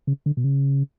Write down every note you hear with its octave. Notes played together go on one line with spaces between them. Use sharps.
C#3
D3
B2
C#3